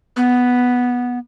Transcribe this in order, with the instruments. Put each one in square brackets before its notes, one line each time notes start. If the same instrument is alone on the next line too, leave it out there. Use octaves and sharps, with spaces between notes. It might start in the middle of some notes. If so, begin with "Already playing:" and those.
[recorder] B3